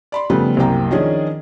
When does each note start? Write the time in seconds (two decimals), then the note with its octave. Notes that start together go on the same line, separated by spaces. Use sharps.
0.12 D5 B5 C6
0.30 C#3 F3 G3 A3 B3 B4
0.57 C2 F#2 C3 A#3 G5 A#5
0.91 D#3 F3 C#4 D4 G#4